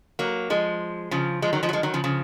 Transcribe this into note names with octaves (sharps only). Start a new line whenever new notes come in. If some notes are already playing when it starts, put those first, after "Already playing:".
F#3 A#3
F3 G#3
C#3 F3
F3 G#3
D#3 F#3
F3 G#3
F#3
F3 G#3
D#3 F#3
C#3 F3
C#3 F3